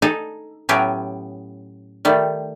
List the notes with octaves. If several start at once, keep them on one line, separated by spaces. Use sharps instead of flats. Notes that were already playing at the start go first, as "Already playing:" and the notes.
D#4 G#4 A4
A2 F#3 B3 C#4 G4 G#4
D#3 G3 A3